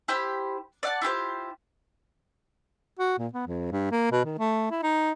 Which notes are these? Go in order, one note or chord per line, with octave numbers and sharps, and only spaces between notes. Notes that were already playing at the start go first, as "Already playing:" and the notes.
E4 G4 C5 B5
D5 E5 F#5 A5
E4 F4 G4 C5
F#4
A#2
B3
F2
G2
A#3
B2
D#3
A3
E4
D#4